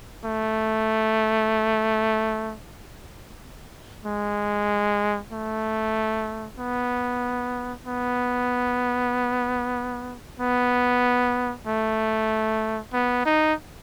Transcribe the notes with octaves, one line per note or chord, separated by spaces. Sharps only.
A3
G#3
A3
B3
B3
B3
A3
B3
D#4